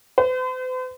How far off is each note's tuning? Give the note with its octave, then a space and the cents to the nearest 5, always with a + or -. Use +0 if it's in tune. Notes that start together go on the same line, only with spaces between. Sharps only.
C5 -45